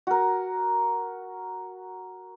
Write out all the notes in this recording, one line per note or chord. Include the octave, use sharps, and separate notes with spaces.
F#4 A#4